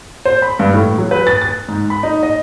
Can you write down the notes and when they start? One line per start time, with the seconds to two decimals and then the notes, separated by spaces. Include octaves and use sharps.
0.25 C5
0.42 B5
0.59 G2
0.74 A2
0.98 F#3
1.11 B4
1.27 A6
1.42 A6
1.68 G#2
1.90 B5
2.03 D#4
2.23 D#5